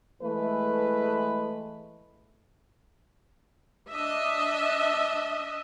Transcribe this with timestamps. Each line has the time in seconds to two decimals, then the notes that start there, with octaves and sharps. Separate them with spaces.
0.22 E3 G#3 A3 B4
3.89 D4 D#5 E5